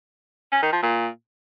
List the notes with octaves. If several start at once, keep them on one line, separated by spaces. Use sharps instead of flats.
C#4
D#3
F3
A#2